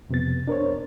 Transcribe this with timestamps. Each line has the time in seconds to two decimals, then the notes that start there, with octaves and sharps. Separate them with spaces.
0.09 F2 C3 F3 B3 A6
0.48 D4 A#4 C5 C#5